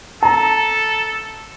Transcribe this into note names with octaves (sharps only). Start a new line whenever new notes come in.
A4 A5 A#5